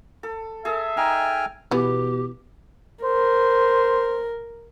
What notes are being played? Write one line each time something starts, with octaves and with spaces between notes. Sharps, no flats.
A4
G#4 A4 E5
D#4 G5 G#5 F6
B2 E3 B3 G4
A#4 C5